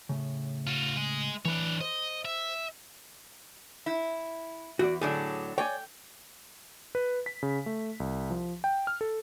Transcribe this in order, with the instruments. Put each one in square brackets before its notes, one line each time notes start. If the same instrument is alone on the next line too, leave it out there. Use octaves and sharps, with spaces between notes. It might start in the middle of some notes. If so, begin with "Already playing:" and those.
[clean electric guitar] A2 C#3
[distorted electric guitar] F4 F#4
G#3 G#4
[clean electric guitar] E3 B5 [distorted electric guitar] D4 C#5
[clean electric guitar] C5 [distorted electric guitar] D#5
[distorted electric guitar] E5
[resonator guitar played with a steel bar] E4
[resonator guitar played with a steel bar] E2 [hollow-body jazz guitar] F#4 D5
[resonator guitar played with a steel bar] A2 D3 F#3 [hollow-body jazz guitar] G#4 D5
[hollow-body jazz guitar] C#5 D5 G#5 [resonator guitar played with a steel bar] G5
[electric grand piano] B4
B6
C#3
A3
C2
F3
G5
F6
A4